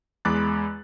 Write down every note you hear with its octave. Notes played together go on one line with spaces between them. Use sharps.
E2 G#3 B5 D6 F#6 A6